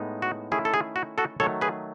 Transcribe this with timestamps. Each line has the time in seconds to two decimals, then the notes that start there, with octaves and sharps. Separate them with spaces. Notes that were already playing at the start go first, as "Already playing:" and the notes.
Already playing: A2 G#3 B3 D#4
0.22 F#4
0.52 D#3 A3 C#4 E4 G#4
0.65 A4
0.74 G#4
0.96 F#4
1.18 F#4 A4
1.40 D#3 F#3 A3 A4 C#5
1.61 G#4 B4